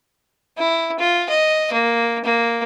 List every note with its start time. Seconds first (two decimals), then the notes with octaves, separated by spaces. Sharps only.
0.58 E4
0.99 F4
1.29 D#5
1.72 A#3
2.24 A#3